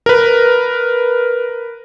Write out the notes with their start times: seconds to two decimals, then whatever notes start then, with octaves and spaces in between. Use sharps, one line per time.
0.06 A#4 B4